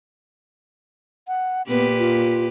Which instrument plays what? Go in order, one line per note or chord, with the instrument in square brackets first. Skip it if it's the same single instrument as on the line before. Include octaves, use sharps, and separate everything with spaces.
[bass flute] F#5
[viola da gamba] A#2 G4 B4 [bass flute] B3
[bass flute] F4